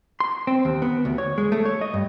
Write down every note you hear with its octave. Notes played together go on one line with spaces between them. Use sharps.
C6
C4
D#2
B3
D2
C#5
G#3
A3
C#5
D#5
G2